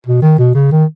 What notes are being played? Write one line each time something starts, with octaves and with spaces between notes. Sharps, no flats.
B2
D#3
B2
C#3
D#3